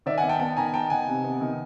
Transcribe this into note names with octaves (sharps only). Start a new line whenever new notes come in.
D#3 D5 E5
F#5 G#5
B3
G5 A5
B3 G5 A5
D#3 G#5 A#5
B3 G5 A5
D#3 F#5 G#5
C3
B3
D#3